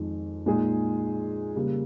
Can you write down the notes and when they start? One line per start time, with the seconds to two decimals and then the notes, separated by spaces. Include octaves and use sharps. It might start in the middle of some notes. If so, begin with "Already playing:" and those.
Already playing: F2 D#3 G#3 D#4
0.46 A#2 G#3 D#4 G#4
1.56 C#3 G3 A#3